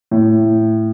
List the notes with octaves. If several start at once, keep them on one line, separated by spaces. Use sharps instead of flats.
A2